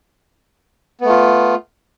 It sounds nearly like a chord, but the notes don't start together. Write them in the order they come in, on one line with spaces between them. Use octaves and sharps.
B3 A3 F4